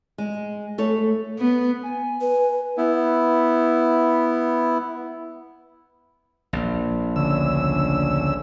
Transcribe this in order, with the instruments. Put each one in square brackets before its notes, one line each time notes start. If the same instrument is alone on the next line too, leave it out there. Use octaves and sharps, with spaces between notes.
[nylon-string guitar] G#3
A3 A4 C#5
[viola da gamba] B3
[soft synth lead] G#5
[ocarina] B4
[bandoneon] B3 E4
[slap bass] A#1
[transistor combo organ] D2 C#3 E6